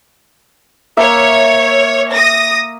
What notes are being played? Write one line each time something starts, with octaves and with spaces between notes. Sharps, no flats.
A#3 C#5 E5
D#6 A#6